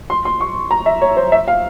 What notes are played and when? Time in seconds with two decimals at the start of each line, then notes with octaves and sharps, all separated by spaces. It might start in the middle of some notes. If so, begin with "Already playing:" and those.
0.10 C6
0.25 C6
0.41 C#6
0.71 A#5
0.86 E5
1.02 C#5
1.17 C5
1.32 E5
1.48 F5